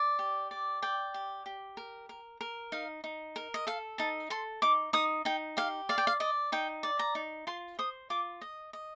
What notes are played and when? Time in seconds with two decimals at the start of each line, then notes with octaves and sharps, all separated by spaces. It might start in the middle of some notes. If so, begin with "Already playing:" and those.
Already playing: D5
0.19 G4
0.51 D5
0.82 D5 G5
1.14 G4
1.46 G4
1.77 A#4
2.09 A#4
2.41 A#4
2.72 D#4 F5
3.04 D#4
3.36 A#4
3.54 D#5
3.67 A4 F5
3.98 D#4 A5
4.30 A4 C6
4.62 D#4 D6
4.93 D#4 D#6
5.25 D#4 G5
5.57 G4 F5
5.89 D5 F5
5.98 G5
6.07 F5
6.20 D5 D#5
6.52 D#4 G5
6.83 D5
6.99 A#5
7.15 D#4
7.47 F4 C6
7.79 C5 D#6
8.10 F4 D6
8.41 D#5
8.73 D#5